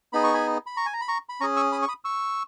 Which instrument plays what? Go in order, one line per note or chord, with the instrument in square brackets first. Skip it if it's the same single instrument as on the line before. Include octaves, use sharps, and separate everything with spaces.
[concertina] B3 D#4 G#4 B5
C#6
G#5 B5
B5
A#5 C#6
G#5
A#5
B5
A#5 C#6
B5
C#4 A#5 C#6
G#4
C#6 E6
B5 D#6
C#6
B5 D#6
C#6 E6